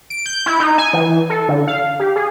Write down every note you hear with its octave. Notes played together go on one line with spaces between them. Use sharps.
D7
G6
E4
D#4
G#5
E3
A4
D3
F5
G4
G#4